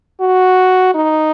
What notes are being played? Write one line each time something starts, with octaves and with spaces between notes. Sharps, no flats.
F#4
D#4